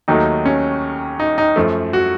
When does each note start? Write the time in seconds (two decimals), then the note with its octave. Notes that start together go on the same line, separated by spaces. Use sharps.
0.08 D#2 D#3 F#3 A3 D#4
0.46 C#4
1.20 D#4
1.38 D#4
1.56 F#2 F3 A3
1.93 F#4